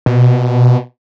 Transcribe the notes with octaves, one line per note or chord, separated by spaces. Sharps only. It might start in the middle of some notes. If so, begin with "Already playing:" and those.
B2